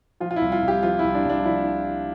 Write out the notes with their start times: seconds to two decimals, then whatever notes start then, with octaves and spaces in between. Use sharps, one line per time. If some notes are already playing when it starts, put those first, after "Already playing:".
0.20 F3 F4
0.31 F4
0.36 E4
0.42 C2
0.52 F4
0.63 C2
0.68 G4
0.83 F3 F4
0.99 C2 E4
1.15 D4
1.25 C2 D4
1.45 F3 E4